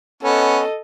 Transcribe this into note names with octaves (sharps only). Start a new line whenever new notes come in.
B3 C#4 A4 D#5